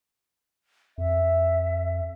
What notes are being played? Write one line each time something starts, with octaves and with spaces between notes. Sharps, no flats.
F2 E5